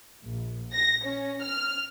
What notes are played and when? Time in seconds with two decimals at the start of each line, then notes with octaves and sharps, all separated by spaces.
0.23 A#1
0.73 A#6
1.05 C#4
1.43 F6